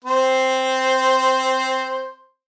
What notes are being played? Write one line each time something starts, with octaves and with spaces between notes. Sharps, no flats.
C4 C5